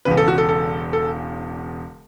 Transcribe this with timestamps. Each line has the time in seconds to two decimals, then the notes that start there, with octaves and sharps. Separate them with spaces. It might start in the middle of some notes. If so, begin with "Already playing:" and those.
0.05 E1 E2 C#3 B4
0.17 A4
0.28 F#4
0.38 A4
0.49 A4
0.93 A4